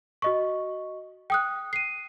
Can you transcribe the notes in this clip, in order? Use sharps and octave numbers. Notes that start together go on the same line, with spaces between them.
F#4 D#5 C#6
G5 D#6 F#6
C7 D#7